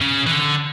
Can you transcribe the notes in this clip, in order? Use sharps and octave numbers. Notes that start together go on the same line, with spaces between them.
C#3
E3
D3